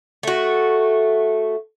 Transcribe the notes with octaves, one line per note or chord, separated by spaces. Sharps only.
A3 F#4